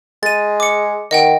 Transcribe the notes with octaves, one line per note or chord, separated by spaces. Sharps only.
G#3 A6 D#7
D6 C#7
D#3 D#5 F#5 G5